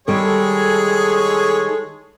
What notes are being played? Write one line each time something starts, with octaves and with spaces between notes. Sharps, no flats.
D#3 G3 G#3 G#4 A4 C#5